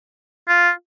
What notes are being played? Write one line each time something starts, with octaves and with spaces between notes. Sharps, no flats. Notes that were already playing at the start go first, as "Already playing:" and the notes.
F4